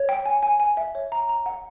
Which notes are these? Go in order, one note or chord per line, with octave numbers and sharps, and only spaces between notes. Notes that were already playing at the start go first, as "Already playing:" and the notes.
Already playing: C#5
G5
G#5
G#5
G#5
E5
C#5
A#5
A#5
F#5